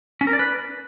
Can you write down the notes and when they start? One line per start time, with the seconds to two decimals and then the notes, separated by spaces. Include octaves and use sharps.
0.21 C#4
0.27 A#4
0.33 D5
0.39 B4